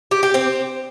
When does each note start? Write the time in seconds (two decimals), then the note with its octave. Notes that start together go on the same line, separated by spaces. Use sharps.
0.11 G4
0.23 G4
0.34 C4